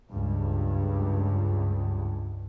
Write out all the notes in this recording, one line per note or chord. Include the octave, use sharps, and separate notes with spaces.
C#2 G2